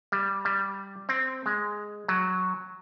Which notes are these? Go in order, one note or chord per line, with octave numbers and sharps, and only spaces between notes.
G3
G3
C4
G#3
F#3